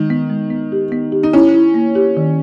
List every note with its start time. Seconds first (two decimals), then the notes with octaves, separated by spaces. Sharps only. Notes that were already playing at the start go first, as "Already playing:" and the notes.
Already playing: D#3 G#3
0.10 B3
0.30 G#3
0.50 B3
0.72 G4
0.92 B3
1.12 G4
1.23 D#4
1.33 C#4 E4
1.54 E4
1.74 A#3
1.95 G4
2.17 D#3